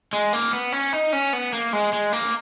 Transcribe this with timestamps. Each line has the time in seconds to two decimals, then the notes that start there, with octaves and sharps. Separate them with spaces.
0.13 G#3
0.33 A#3
0.53 B3
0.72 C#4
0.93 D#4
1.13 C#4
1.33 B3
1.53 A#3
1.73 G#3
1.93 G#3
2.13 A#3